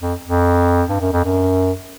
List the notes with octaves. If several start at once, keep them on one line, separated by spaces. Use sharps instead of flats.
F2
F2
G2
F#2
F2
F#2